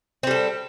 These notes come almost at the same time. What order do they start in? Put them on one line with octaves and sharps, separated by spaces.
C4 G3 A4